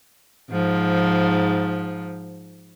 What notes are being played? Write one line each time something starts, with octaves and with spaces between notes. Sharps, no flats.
G#2 F3